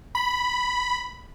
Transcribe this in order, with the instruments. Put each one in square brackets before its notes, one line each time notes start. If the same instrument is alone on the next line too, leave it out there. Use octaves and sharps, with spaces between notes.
[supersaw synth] B5